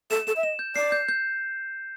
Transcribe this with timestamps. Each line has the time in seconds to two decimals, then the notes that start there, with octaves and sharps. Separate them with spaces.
0.11 A4 E7
0.27 A4 E7
0.36 E5
0.43 D#5 E7
0.59 G6
0.76 D5 C7
0.92 G6
1.08 G6